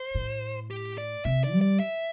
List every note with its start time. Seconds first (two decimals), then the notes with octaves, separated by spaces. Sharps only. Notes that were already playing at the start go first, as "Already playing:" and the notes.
Already playing: C5
0.15 A2
0.71 G4
0.98 D5
1.25 C3 E5
1.44 D5
1.53 G3
1.61 D5
1.80 E5